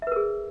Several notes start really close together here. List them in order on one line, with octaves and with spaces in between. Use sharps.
E5 B4 A#4 G#4